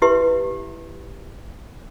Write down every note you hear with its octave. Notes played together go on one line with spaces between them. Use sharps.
E4 G4 B4 E5 C6